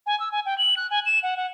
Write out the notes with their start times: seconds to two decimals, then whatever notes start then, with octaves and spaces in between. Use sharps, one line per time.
0.06 G#5
0.20 E6
0.32 G#5
0.46 G5
0.58 F#7
0.77 F#6
0.91 G#5
1.06 E7
1.23 F#5
1.37 F#5